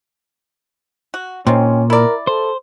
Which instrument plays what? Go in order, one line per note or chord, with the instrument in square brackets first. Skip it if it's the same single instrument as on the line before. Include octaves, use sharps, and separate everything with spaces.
[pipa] F#4
[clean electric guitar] A#2 [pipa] D#3 C4 [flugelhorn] C#4
[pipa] E4 D5 [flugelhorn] A#4
[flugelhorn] A4 [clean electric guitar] C5